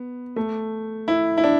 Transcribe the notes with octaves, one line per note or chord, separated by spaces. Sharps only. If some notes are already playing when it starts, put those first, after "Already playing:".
Already playing: B3
A3
E4
E4
D4